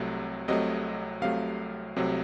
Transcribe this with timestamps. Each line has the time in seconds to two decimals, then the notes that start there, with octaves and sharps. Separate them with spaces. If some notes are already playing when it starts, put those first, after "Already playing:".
Already playing: C2 C3 F#3 A3
0.48 C2 C3 F#3 A3 D#5
1.21 C2 C3 F#3 A3 F5
1.96 C2 C3 F#3 A3